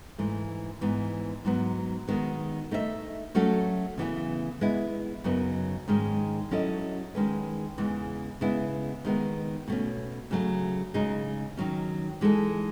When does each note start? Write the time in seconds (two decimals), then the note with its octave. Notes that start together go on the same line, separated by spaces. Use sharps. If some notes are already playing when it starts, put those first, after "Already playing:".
0.18 G#2 E3 A3
0.81 G#2 E3 B3
1.45 G#2 F#3 B3
2.07 D#3 G#3 B3 F#4
2.71 A3 D#4 A4 E5
3.35 F#3 A3 C#4 F#4 A4
3.98 C#3 E3 B3 E4
4.61 G#3 B3 E4
5.24 F#2 C#3 F#3 B3 D#4
5.88 G#2 D#3 G#3 C#4
6.51 F#3 C#4 E4 A4 D#5
7.15 D#3 G#3 C#4 G#4 B4
7.78 E2 C#3 E3 G#3
8.41 C#3 G#3 B3 E4
9.05 D#3 G#3 B3
9.68 B2 A3 C#4
10.31 C#3 F#3 A3
10.94 C#3 G#3 D#4 G#4
11.57 D#3 F#3 C#4
12.21 E3 G#3 D#4 A4